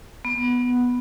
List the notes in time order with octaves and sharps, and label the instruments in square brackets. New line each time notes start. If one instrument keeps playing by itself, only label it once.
[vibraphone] B3